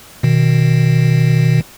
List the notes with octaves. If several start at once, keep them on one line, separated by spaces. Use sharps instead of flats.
B2 D#3